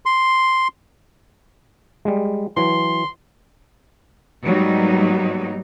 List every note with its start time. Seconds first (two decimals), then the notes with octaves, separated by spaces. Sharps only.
0.06 C6
2.05 G3 G#3
2.57 E3 F#3 C6
4.44 G#2 F#3 G3 A#3 B3 D#4